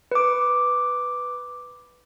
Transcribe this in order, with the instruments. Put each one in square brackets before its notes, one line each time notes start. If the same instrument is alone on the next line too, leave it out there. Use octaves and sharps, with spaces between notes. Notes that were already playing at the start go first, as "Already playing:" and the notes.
[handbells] B4 D6